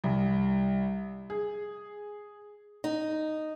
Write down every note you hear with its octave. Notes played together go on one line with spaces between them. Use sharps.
C2
G#4
D#4